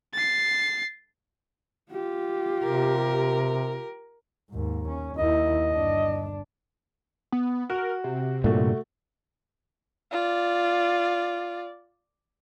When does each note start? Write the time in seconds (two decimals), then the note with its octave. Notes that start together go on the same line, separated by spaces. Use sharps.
0.14 A6 C7
1.91 F4 G4
2.64 C3 A#4
4.50 D#2 G#2
4.88 C#4
5.17 D#2 E4 D#5
5.71 G1 D4
7.32 B3
7.70 F#4 A#4
8.04 C3
8.44 G2 A#2 G3 A3 F#4
10.12 F4 D5